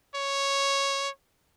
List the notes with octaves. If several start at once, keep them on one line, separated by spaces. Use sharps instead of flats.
C#5